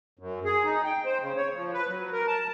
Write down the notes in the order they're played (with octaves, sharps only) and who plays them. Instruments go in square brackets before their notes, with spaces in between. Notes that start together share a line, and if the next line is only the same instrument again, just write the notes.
[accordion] F#2
G#4
D#4
G5
C5
C#3
C#5
F3
B4
F#3
A#4
A5